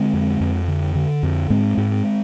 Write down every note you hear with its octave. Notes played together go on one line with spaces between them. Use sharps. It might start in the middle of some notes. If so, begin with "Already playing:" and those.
Already playing: D3 G#3 C4
F2
F2
D3
D3
F2
G#2 G#3 C4
G#2